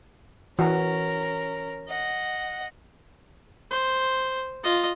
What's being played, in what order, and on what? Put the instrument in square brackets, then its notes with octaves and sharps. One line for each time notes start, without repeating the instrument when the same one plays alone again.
[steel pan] E3 F#4 [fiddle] C#4 A#4
[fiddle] D#5 F#5
[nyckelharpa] C5
F4 D#5